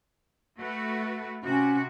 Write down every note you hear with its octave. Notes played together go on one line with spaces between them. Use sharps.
A3 F#4 B4
C3 C#4 F#4